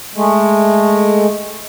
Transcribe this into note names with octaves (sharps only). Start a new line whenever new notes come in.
G#3 A3